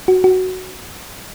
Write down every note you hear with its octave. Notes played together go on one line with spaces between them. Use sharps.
F#4
F#4